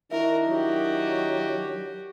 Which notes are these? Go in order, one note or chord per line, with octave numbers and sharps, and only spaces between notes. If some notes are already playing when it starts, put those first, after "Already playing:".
D#3 D4 E4 F#4 A#4 E5
F#3 F#4 G4